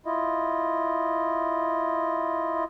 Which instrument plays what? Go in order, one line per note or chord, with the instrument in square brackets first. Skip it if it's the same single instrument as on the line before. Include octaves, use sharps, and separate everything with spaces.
[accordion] E4 F4 D#5